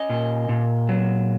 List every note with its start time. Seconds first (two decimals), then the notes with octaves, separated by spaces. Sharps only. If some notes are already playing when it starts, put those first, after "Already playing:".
Already playing: C#4 D#5
0.10 A#2
0.49 A#2
0.89 F#3